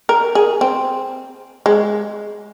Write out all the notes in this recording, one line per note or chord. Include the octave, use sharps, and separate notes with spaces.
A#4
G#4
C4
G#3